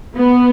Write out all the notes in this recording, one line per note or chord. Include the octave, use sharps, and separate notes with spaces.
B3